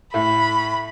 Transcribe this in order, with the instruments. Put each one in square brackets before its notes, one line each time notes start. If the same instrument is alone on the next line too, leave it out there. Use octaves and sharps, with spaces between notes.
[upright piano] A2 [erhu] B5